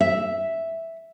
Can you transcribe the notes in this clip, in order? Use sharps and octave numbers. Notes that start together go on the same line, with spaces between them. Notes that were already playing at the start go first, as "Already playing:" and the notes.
E5